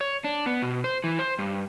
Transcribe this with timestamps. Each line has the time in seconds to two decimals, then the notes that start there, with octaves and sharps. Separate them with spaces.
0.01 C#5
0.24 D4
0.46 B3
0.62 B2
0.84 C5
1.04 E3
1.19 C5
1.39 G2